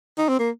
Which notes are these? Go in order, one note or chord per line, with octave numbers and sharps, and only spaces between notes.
D#4
C4
A#3